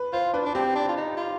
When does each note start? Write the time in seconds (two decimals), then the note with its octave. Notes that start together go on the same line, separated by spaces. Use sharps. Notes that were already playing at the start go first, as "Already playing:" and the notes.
Already playing: B4
0.13 F4 C5
0.33 D4 B4
0.46 D4
0.54 C4 G4
0.75 D4
0.88 F4
0.96 D#4
1.17 F4